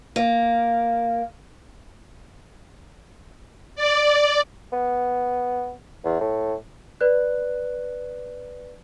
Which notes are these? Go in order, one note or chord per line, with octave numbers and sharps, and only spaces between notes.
A#3
D5
B3
E2
A2
B4 D5 F#6